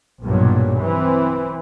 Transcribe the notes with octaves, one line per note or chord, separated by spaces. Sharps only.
B1 G2 A#2 F#3
E3 C4